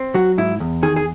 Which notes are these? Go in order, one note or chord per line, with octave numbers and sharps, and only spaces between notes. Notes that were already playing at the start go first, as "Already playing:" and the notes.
Already playing: C4
F#3 F#4
G#2 E4
E2
D#3 G#4
G#4